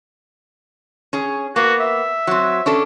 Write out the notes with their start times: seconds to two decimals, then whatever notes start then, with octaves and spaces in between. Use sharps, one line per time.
1.13 C#4 G#4
1.56 A#3 B3 F#4
1.80 E5
2.27 F#3 C4
2.66 C#4 D4 A4